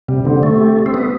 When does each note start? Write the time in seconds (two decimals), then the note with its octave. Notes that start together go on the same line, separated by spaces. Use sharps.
0.08 C3 G3
0.25 D3 C4
0.43 C3 A3
0.60 G4
0.77 G3
0.86 C4
0.94 B3 B4